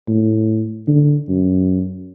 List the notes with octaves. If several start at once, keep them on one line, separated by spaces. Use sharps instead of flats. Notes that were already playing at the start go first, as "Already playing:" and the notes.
A2
D3
F#2